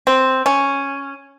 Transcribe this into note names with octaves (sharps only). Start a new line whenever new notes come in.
C4
C#4